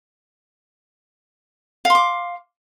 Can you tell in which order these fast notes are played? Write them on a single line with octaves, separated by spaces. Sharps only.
F5 C6 D6